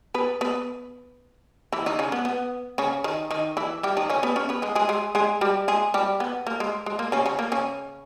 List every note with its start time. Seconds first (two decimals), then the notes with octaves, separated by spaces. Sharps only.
0.14 B3 B4
0.41 B3 B4
1.73 E3 E4
1.86 D#3 D#4
1.99 C#3 C#4
2.12 B3
2.25 B3
2.78 C#3 C#4
3.04 D#3 D#4
3.31 D#3 D#4
3.57 E3 E4
3.83 G3 G4
3.97 D#3 D#4
4.10 C#3 C#4
4.23 B3 B4
4.36 C#4 C#5
4.49 B3 B4
4.62 G#3 G#4
4.75 G#3 G#4
4.89 G#3 G#4
5.15 G#3 G#4
5.41 G3 G4
5.68 G#3 G#4
5.94 G3 G4
6.20 B3
6.47 A#3
6.60 G#3
6.86 G#3
6.99 A#3
7.12 C#3 C#4
7.26 C#3 C#4
7.39 A#3
7.52 C#3 C#4